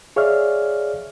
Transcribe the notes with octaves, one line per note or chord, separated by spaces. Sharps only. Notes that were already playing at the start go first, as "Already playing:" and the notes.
G#4 C#5 D5 E5 F5 F6